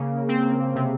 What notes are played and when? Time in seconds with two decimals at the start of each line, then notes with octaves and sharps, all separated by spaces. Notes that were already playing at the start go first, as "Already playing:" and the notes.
Already playing: C#3 A#3
0.28 C4
0.75 C3